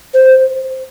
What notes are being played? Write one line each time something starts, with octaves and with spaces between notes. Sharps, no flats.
C5